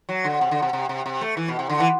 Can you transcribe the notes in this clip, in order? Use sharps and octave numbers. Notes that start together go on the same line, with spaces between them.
F#3
D3
C3
D3
C3
C3
C3
C3
A3
E3
B2
C3
D3
E3